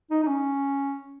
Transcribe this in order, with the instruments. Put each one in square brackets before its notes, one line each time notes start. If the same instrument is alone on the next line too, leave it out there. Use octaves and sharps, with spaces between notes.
[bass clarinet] D#4
D#4
C#4